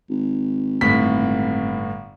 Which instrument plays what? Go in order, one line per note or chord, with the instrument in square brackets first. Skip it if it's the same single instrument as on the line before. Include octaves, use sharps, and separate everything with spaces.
[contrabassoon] G#1
[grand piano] G1 A2 B6